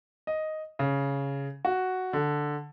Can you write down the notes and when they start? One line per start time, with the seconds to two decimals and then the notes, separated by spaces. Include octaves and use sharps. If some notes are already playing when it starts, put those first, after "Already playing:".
0.27 D#5
0.79 C#3
1.65 F#4
2.13 D3